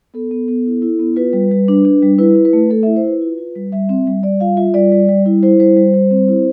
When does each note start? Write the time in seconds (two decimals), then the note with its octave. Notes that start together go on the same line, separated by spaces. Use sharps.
0.14 B3 A4
0.31 B3
0.48 B3
0.66 E4
0.82 E4
0.99 B3
1.16 F4 B4
1.33 G3
1.51 G3
1.68 D4
1.85 D4
2.02 G3
2.18 E4 B4
2.35 E4
2.45 B4
2.53 A3
2.70 A3 A4
2.83 E4 E5
2.96 C5
3.04 E4 B4
3.22 F4
3.38 F4
3.55 G3
3.72 G3 E5
3.89 C4
4.07 G3
4.23 G3 D5
4.40 F4 F5
4.57 F4 E5
4.74 G3 D5
4.92 G3
5.09 G3
5.26 E4
5.43 E4 C5
5.60 G3 C5
5.77 G3
5.94 G3
6.11 C4
6.28 E4